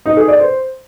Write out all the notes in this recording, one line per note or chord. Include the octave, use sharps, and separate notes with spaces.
D#4
G#4
D5
C5